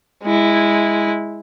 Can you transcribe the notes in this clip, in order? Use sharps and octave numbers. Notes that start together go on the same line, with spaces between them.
G#3 E4